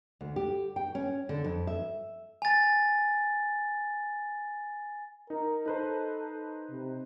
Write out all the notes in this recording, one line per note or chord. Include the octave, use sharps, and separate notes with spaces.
D2
G4
G5
C#4
D3
F2
E5
G#5 A6
D#4 A#4
D#4 A4 B4 C5
C3